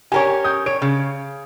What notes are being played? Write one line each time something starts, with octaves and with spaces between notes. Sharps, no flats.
G4 A#4 C#5 G#5
D#6 G6
C#5 D7
C#3